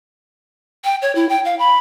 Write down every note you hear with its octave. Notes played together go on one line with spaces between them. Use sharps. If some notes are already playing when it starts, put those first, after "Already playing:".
G5
C#5
E4
G5
F5
B5